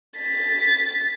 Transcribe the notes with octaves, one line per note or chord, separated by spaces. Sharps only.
A6 B6